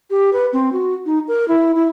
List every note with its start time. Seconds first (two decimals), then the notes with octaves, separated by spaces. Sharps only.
0.10 G4
0.33 B4
0.53 C4
0.73 F#4
1.06 D#4
1.28 A#4
1.48 E4
1.75 E4